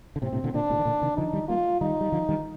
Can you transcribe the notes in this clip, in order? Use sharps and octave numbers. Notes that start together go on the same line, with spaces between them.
D3
A2 C3 C4
A2 C3
A#2 D3
A#2 D3 D4
A2 C3
D#3
A#2 D3
C3 D#3
D3 F3 D#4
D#3 G3
G3 A#3 F4
D#3 G3 D#4
G3
D3 F3
D#3 G3